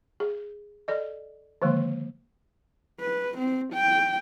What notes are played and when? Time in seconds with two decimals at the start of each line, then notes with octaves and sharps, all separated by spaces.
0.20 G#4
0.88 A4 D5 D#5
1.62 D3 D#3 F3 G#3 A#3
3.00 B4
3.38 C4
3.73 G5